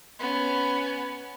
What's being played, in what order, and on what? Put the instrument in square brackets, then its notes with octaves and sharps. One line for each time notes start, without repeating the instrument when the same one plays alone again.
[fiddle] B3 C#4